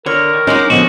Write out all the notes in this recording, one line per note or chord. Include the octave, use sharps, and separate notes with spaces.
D3 A#4 C#5
D#3
G#3 C#4 D#4 F#5 D6
D3 F3 B3 F#4 D#5